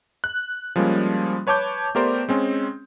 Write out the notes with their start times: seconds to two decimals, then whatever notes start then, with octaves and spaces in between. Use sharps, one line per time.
0.24 F#6
0.76 F3 G3 G#3 A#3 C#4
1.47 B4 C#5 A5 D6 G6
1.95 A3 B3 G4 A#4 C5 D5
2.29 G#3 C4 C#4